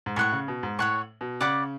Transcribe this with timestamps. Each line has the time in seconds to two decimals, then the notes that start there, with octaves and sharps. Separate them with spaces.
0.06 G#2
0.16 A2 C#5 F#5 C#6
0.32 C#3
0.48 B2
0.63 G#2
0.79 A2 C#5 F#5 C#6
1.21 B2
1.41 C#3 D5 F#5 B5 D6